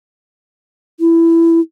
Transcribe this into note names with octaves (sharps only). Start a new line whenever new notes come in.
E4